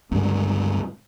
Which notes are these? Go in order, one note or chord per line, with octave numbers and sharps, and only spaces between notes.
C#2 G2 D3